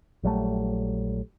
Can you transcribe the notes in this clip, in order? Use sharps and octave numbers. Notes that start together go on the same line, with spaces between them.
A#1 F#3 G3 A3